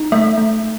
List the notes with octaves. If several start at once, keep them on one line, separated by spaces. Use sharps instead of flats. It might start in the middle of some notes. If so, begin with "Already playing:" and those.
Already playing: D#4
A3 E5
A3